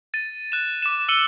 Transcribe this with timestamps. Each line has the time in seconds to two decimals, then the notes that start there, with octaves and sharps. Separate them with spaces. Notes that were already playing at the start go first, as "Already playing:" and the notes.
0.14 A6 D#7
0.52 F#6 E7
0.82 D6 E7
1.09 E6 C#7 D#7 G7